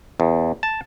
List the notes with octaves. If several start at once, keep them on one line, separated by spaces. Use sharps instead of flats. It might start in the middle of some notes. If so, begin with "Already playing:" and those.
E2
A5